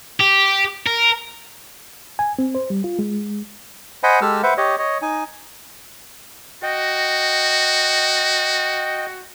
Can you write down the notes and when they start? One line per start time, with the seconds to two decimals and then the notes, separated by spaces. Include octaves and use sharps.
0.20 G4
0.87 A#4
2.19 G#5
2.39 C4
2.55 C5
2.70 G3
2.84 F4
2.99 G#3
4.03 C5 D#5 F#5 G#5 B5
4.22 G#3 G4 A4 E6 F6
4.43 B4 C5 E5 F#5
4.58 G4 C#5 D#5
4.79 C#5 D#5
5.02 D#4 G#5
6.63 F#4 D#5 G5